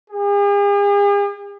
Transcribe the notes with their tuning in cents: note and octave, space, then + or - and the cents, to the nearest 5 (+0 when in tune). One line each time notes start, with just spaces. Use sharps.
G#4 -45